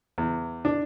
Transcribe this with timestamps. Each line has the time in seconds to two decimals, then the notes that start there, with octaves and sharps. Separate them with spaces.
0.18 E2
0.65 D4